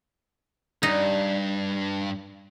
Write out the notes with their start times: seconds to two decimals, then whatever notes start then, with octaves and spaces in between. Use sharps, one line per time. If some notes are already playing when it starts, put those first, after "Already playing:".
0.83 G2 G3 C#4 D#4